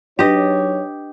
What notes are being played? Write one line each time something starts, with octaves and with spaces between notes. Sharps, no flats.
F#3 D4 D#4 G4 B4 C#5 D#5